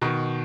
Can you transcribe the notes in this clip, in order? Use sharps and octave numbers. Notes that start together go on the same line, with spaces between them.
B2 D#3